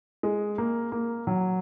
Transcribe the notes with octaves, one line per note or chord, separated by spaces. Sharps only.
G#3
A#3
A#3
F#3